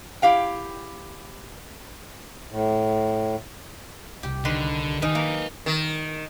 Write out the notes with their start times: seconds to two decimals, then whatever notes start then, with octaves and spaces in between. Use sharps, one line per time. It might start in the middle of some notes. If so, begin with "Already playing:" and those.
0.22 E4 G4 F5 G5
2.50 A2
4.23 C2 C3 G4
4.45 D3 D#3 B4 C6
5.02 D#3 B4 G#5
5.15 A#3
5.66 D#3